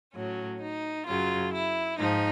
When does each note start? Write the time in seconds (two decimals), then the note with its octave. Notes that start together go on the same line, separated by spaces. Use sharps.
0.14 A2 F#3 C#4
0.60 D#4
1.06 F#2 C#3 F#3 F4
1.52 E4
1.98 G#2 F3 D#4